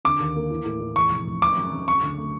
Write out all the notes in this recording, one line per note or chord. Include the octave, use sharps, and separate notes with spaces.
D3 D6
D#2
A#3
E3
A2
A2
E2 C#6
F1
F1
D#3 D6
F#2
F#2
C#3 C#6
D2
A3